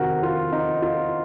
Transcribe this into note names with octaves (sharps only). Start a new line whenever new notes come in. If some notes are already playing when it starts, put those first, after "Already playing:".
Already playing: F2 C3 D#3 F#4 A#4
F4
D#4
F4